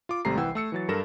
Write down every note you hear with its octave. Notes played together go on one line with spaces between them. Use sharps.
F4 D6
G#1 C3 G3 A3 A#5 C7
C2 E3 F#5 G5 E6 G#6
A3 E6 C#7
E3 F#3 A6
G2 A4 A#4 A#6 E7